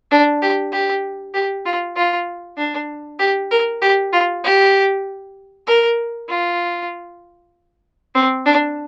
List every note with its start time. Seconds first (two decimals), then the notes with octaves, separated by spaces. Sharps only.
0.11 D4
0.42 G4
0.73 G4
1.34 G4
1.66 F4
1.96 F4
2.58 D4
3.19 G4
3.51 A#4
3.82 G4
4.13 F4
4.44 G4
5.67 A#4
6.29 F4
8.15 C4
8.46 D4